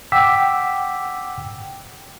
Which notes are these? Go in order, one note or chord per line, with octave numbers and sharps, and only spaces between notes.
F#5 G5 D6 E6 B6